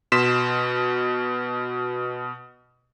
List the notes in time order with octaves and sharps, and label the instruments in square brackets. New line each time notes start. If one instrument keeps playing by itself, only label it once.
[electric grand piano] B2 C6 B6 E7